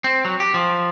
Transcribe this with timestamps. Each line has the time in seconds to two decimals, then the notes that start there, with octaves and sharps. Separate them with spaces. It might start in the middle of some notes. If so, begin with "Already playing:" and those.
0.04 C4
0.25 F#3
0.40 G4
0.54 F3